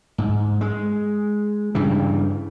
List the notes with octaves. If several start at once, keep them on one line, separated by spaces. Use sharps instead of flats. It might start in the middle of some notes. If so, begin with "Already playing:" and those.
G#2
G#3
G2 C#3 E3